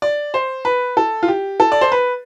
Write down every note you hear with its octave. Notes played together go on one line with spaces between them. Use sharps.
D5
C5
B4
A4
F4
G4
A4
D5
C5
B4